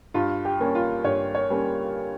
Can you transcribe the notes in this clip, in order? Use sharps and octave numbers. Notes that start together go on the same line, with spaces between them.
G2 F4
G4
G3 A#3 C#4
F4
G2 C#5
C#5
G3 A#3 C#4